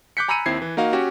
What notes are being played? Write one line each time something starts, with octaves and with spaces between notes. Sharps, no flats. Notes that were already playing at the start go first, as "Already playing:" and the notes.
D6 F#6 G6 B6 C#7
G#5 A#5 B5 E6 C#7 D#7
D#2 C4 E4 G#6 C7
E3
A#3 D#4 F#4 F5
C#4 F#4 G4